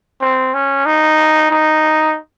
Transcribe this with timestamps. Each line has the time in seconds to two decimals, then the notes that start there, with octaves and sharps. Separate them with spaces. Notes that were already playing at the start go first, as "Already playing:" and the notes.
0.21 C4
0.54 C#4
0.86 D#4
1.50 D#4